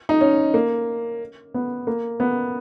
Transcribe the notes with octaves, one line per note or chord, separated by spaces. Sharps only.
D#4
C#4
A#3
B3
A#3
B3